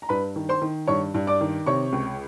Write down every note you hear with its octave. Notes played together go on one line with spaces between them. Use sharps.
A#5
G2 B4 B5
D#3
C5 C6
D#3
G2 C#5 C#6
G2
D5 D6
D#3
C3 C#5 C#6
C#2